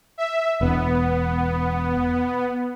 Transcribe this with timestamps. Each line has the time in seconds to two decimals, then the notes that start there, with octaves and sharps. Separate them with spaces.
0.18 E5
0.61 E1 B3